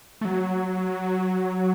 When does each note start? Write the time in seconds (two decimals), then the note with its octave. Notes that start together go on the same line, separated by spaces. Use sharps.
0.21 A3
0.25 F#3